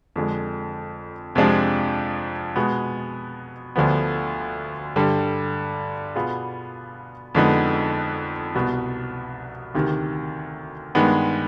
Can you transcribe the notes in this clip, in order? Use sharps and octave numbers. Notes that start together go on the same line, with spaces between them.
F2 D3 G#3
F2 C3 F3 G#3 D4
B2 G#3 B3
D2 D3 F3 B3
G2 D3 G3
B2 B3 F4 G#4
F2 D3 G#3 B3 D#4
C2 B2 B3
D2 C3 D#3
G2 D#3 G#3 B3